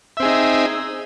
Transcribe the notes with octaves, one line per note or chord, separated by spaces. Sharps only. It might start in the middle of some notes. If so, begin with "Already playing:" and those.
C4 D#4 G#4 E5